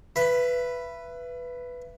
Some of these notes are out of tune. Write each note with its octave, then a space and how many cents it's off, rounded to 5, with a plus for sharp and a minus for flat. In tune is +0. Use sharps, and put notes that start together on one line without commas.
B4 +0 E5 +35 B5 +0